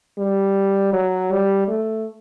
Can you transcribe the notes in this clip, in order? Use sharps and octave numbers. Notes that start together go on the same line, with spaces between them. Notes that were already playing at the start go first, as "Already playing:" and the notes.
G3
F#3
G3
A3